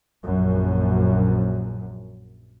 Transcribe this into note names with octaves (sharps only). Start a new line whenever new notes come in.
A#1 F#2